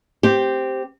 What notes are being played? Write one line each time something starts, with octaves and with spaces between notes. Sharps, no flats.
C4 G4